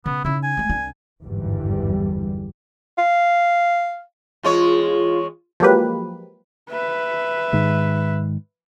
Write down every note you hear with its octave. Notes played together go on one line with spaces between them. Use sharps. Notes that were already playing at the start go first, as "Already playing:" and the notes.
C#3 B3
C#3 D#4 E4
G#5
G#3 A3
C2 D4
G#1 E2 G2 D3 E3 G3
F5
E2 G#3 F4 C#5
F3 F#3 G#3 A#3 G4 B4
B4 E5
G#2 D#3 G#3